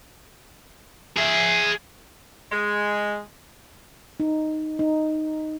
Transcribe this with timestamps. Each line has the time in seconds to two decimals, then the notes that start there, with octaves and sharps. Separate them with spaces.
1.17 G#4 E5
2.52 G#3
4.20 D#4
4.79 D#4